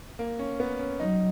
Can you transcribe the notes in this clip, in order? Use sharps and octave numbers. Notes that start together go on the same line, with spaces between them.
A#3
C#4
B3
C#4
F#3 D#4